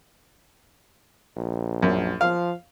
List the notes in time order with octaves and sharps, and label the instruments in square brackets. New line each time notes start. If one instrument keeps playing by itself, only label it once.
[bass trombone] A#1
[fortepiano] F#2
[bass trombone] F3 [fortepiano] F5